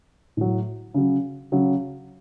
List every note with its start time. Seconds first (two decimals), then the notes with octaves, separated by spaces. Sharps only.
0.37 A2 F#3
0.94 C#3 F#3
1.52 C#3 F#3